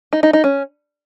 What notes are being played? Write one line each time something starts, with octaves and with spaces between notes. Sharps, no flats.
D#4
D#4
D#4
C#4